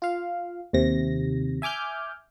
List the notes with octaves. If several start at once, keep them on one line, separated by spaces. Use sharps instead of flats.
F4 F5
D#2 C3 A#6
E5 G#5 D6 F6 G6